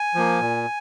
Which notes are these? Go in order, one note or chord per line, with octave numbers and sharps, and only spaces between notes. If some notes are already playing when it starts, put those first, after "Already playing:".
Already playing: G#5
F3 A#3
A#2